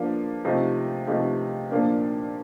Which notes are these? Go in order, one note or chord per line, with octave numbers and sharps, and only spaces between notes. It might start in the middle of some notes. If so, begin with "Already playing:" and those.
Already playing: F3 A#3 D4
C3 F3 A3 D#4
C3 F3 A3 D#4
A#2 F3 A#3 D4